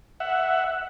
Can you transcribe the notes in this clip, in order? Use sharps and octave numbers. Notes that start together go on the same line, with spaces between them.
E5 F#5